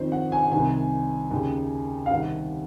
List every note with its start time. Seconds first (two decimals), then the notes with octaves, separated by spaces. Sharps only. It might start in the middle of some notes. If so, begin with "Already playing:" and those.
Already playing: F2 D#3 C5
0.12 F#5
0.32 G#5
0.43 F#5
0.52 C2 C3 D#3 G#5
1.31 D#2 C#3
2.06 F5
2.10 C2 C3 D#3 F#5